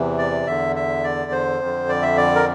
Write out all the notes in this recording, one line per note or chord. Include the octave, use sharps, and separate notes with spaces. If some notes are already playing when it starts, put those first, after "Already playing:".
Already playing: E2 C3 E3
D5
E2 D3 E5
E5
D5
C5
F2
D3
D5
E5
D5
A#4